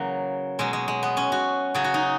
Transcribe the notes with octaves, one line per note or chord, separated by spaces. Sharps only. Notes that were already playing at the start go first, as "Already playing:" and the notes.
Already playing: C#3 E3 F#3 A#3 F#4
B2 F#3 G#3
G#3
G#3
B3
C#4
F#4
C#3 F#3 G#4
F#4
D#4